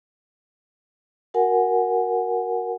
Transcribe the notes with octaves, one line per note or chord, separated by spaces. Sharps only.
F#4 A#4 F#5 G#5